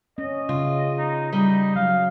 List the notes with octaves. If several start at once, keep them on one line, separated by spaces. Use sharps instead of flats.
C#4 D#5
C#3 F4
D#4
G3 D#4 D#5
F#3 F5